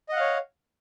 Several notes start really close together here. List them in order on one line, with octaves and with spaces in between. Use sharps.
D#5 F#5 F5 C#5